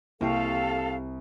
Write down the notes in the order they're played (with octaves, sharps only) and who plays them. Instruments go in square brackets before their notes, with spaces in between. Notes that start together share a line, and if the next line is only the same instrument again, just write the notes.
[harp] C2 C#6 [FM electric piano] A#3 E4 G5 [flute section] A4 F5